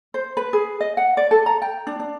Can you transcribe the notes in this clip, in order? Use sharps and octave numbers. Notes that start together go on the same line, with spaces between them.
C5
B4
G#4
D#5
F#5
D5
A4
A#5
G5
D4
D4